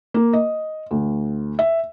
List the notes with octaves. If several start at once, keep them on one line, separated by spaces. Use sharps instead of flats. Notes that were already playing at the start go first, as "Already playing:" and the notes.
A#3
D#5
D2
E5